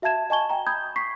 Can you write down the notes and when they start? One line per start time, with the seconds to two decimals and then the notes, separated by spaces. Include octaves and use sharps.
0.02 F#4 E5 F5 A5 G#6 E7
0.30 D#5 G#5 A5 C#6 G#6 G7
0.50 G5 A#5
0.67 B5 D#6 G6 G#6
0.96 C#6 B6 C7